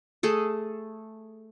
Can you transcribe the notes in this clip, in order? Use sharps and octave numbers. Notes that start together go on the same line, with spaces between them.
A3 G#4 A4